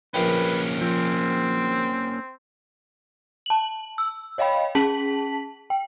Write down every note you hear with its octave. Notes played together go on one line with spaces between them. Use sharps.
A#1 A#3 C#4 B4 G5
F3 C4
A5 F#7
E6
C#5 D#5 F5 G5 B5
C#4 G#4 A5 B6 F#7
G5